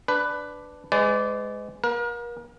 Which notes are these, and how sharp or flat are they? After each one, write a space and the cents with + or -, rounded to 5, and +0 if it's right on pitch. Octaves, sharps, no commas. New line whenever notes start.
D4 +0 B4 +10
G#3 +0 B4 +45 D5 -15
A#3 +45 A#4 +35